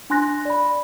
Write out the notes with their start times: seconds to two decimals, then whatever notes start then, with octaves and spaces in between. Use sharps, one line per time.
0.10 D4 G#5 C6 F#6 A#6
0.45 D5 B5